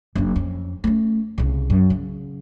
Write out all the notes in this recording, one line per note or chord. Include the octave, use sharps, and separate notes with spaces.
F#1 D4
F2 C#4
A3 C#4
C2 C#3
F#2
C#3